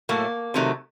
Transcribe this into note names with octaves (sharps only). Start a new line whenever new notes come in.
A2 F#3 A3 A#3
C3 D#3 F#3 A3